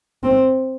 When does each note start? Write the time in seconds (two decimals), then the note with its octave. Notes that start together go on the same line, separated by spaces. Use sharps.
0.23 C4